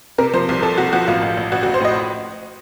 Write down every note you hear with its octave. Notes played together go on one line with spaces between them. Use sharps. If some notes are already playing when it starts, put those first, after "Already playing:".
C3 A#4
F3 C5
C2
C2 A4
C2 F#4
F3 F#4
A1 F4
A1
A1
A1 F#4
F#4
A1
C5
A2 D#5